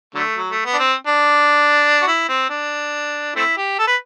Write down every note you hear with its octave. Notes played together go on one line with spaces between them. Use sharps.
D3 F#3 A3
F#3
A3
B3
D4
C4
D4
F#4
E4
C4
D4
A3 C4 E4
G4
A4
B4